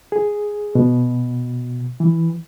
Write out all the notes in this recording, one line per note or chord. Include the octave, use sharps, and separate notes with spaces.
G#4
B2
E3